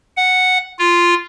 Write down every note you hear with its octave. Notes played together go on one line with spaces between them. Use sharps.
F#5
F4